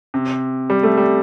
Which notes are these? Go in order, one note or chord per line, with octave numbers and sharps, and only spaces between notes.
C3
G3
A3
G3